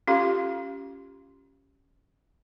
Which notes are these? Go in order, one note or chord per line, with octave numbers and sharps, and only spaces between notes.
C#4 F4 G4 A4 F5 C6